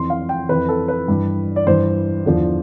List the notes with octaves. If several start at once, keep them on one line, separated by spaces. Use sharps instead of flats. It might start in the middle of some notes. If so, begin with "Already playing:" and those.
Already playing: F2 E3 C6
F5
G5
F2 E3 B4
A4
B4
G2 E3
D5
G2 E3 C5
E2 D3 F3